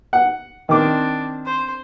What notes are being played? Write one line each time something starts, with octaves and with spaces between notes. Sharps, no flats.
F#5
D#3 C4 D4 D6
C5 C6